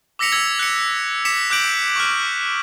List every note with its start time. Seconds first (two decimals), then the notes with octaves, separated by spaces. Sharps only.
0.19 D6 E6 A#6 B6 C#7 F7
0.32 E6 G#6 C#7
0.59 F#6 C#7
1.25 D6 B6 C#7 E7
1.50 D6 F#6 G6 D7 F#7
1.96 C#6 F6